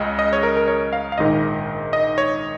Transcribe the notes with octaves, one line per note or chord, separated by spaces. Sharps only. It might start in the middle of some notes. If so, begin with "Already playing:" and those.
Already playing: C#2 C#3 D#5
D#5
C#5
A#4
A#4
C#5
F5
F5
A#1 G#2 D#3 D#5
D#5
C#5